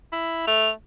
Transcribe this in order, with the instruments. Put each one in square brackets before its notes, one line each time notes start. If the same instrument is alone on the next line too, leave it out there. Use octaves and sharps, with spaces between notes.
[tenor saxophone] E4
[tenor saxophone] A3 [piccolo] F7